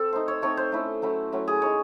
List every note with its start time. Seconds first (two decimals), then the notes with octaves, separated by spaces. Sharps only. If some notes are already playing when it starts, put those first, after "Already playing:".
Already playing: C4 A4
0.12 A3 D#4 C5
0.28 C#5
0.42 A3 C4 D#4 C#5
0.57 C5
0.72 A3 C#4 E4
1.02 F#3 A3 C#4 E4
1.32 F#3 A3 C#4
1.48 G#4
1.62 G#3 D#4 C#5